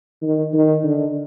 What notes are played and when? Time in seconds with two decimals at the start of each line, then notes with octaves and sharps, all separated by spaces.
0.23 D#3
0.53 D#3
0.84 D3